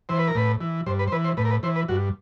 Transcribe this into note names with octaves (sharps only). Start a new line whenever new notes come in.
E3 C5
B4
A#4
A2 B4
E3
G2 C5
B4
C5
E3 B4
C5
A2 B4
A#4
B4
E3 C5
B4
G2 F#4